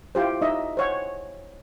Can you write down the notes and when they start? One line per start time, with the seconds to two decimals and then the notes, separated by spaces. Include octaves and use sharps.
0.15 E4 F4 G4 C5
0.41 D#4 D#5 E5
0.77 C5 C#5 F#5